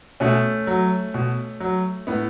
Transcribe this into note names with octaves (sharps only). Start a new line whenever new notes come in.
B2 A3 C#4
F#3
B2
F#3
A2 B3